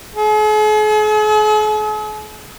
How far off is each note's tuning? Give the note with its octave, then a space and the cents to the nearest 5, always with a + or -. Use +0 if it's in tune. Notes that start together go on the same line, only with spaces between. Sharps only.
G#4 +45